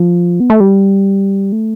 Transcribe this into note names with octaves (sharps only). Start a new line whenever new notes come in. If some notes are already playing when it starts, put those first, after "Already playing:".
Already playing: F3
B3
A3
G3
A3